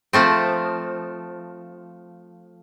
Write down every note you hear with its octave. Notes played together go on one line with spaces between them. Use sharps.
F3 A3 C4